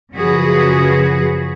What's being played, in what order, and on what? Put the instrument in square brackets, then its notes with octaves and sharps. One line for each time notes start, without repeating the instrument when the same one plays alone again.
[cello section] F#2 C#3 F3 F#4 G#4 B4